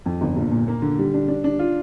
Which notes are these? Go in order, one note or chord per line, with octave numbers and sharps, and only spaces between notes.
F2
G1
A#1
A#2
A#3
D3
G3
D4
D4
D4
F4